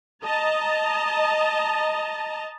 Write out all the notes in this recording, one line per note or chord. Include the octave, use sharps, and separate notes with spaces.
D#5 A5 A#5